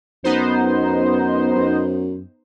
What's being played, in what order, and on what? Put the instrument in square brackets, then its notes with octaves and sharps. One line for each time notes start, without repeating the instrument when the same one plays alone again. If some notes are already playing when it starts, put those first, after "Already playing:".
[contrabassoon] F#2 [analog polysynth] B3 D#4 C5
[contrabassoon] F#2